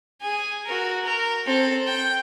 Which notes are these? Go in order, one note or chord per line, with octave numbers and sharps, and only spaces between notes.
G#4 G#5
F#4 A#4
A#4
C4 A4
G5